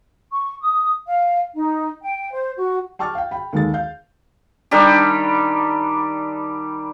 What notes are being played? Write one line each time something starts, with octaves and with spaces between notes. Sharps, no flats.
C#6
D#6
F5
D#4
G5
C5
F#4
G5 A5 C#6 D6 F6 A6
F5 G5
G5 B5
D#2 D#3 G#3 A4 A6
F5 G6
D#3 G3 D4 G4